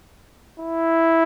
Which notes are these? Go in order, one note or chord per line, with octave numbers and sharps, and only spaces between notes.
E4